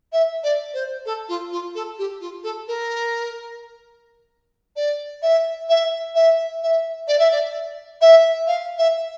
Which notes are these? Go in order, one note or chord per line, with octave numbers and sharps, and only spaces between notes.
E5
D5
C5
A4
F4
F4
A4
G4
F4
A4
A#4
D5
E5
E5
E5
E5
D5
E5
D5
E5
F5
E5